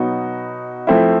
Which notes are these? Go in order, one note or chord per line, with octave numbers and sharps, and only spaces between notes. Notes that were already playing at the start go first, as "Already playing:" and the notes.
Already playing: B2 F#3 B3 D#4 F#4
F3 A3 C4 E4